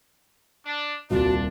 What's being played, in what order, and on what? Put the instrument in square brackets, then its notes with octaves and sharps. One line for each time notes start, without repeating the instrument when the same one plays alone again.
[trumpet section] D4
[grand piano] D#1 C2 F4 [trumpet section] D4 [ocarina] F#4